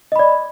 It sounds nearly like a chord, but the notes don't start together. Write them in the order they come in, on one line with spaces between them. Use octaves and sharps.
D#5 B5 D5